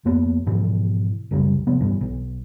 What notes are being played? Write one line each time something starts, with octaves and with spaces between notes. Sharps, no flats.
F2 A#3 B3
G#2 B2 E3 F3
C2 F#2 C#3 G3
C3 F3 B3
G2 B2 E3
B1